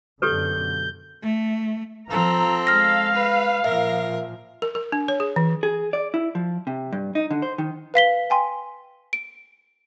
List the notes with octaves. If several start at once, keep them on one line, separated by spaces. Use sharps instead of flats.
F#2 B2 D3 G4 A4 B4 G6
A3
F3 C4 A4 A#5
G#3 F5 F6 A#6
B4
A#2 F3 A#4 E5
A#4
A#4
D4
C#5
G#4
E3
G#4
D5
E4
F3
C3
G2
D#4
D3
C5
D#3
B4 F5 B6 G7
G5 G#5 C6
D7